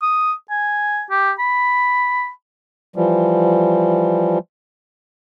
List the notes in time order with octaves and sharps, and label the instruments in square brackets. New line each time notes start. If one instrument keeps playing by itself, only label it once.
[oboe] D#6
G#5
G4
B5
[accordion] E3 F3 G3